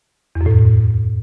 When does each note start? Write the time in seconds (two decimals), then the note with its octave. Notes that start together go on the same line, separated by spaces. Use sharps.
0.35 E2
0.41 F#2
0.46 A2